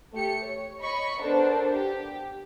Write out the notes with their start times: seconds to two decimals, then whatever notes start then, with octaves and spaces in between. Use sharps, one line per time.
0.13 A3 G4 C#7
0.44 C#5
0.81 C#5 D#5 B5 C#6
1.22 B3 D4 A4 A#4 C5
1.73 G4